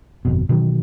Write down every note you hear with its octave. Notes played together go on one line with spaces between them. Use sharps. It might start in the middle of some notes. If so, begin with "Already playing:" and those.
G1 F2 B2
B2 D#3 E3 F#3